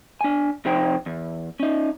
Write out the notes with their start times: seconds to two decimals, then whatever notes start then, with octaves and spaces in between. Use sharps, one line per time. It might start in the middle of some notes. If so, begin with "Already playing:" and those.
0.21 D4 G#5
0.65 C3 F3 D#4 C5 G5
1.06 E2
1.60 C#4 D#4